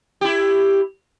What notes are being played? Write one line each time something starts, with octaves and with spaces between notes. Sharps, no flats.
E4 G4